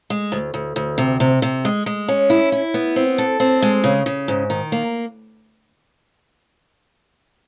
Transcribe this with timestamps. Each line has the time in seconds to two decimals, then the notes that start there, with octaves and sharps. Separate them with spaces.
0.10 G#3
0.32 D2
0.54 D2
0.76 D2
0.98 C3
1.20 C3
1.42 C3
1.65 G#3
1.86 G#3
2.08 C#4
2.30 E4
2.52 E4
2.74 B3
2.96 C4
3.18 A4
3.40 C4
3.62 G#3
3.84 C#3
4.06 C#3
4.28 G#2
4.50 D#3
4.72 A#3